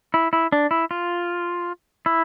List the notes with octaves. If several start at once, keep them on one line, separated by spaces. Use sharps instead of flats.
E4
E4
D4
E4
F4
E4